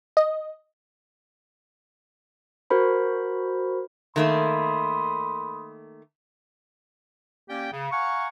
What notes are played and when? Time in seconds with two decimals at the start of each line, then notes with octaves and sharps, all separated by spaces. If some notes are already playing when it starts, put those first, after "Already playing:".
0.17 D#5
2.70 F#4 A#4 C5 B5
4.16 D#3 A3 A#3 B5 C6 D#6
7.48 A#3 C#4 G4 D5 G5
7.72 C#3
7.91 F5 F#5 G#5 A#5 C#6